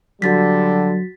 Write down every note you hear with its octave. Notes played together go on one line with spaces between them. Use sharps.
D3 F#3 G3 F#4 A6 B6